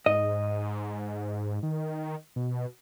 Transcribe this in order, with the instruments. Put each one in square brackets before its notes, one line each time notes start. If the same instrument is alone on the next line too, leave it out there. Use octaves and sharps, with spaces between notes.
[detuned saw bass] G#2 [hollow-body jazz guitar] D#5
[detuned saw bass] D#3
B2